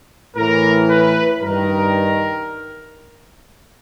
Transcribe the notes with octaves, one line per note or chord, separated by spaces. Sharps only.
A2 E3 A#4
B4
G2 D#3 A#4